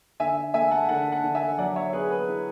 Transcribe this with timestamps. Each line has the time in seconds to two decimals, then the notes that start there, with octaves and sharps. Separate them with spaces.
0.20 D3 E5 G#5
0.54 A3 E5 G#5
0.71 F#5 A5
0.88 D3 F#5 A5
1.12 F#5 A5
1.24 D3
1.35 E5 G#5
1.58 F#3 D5 F#5
1.76 C#5 E5
1.93 B3 G#4 B4
2.10 G#4 B4
2.27 E4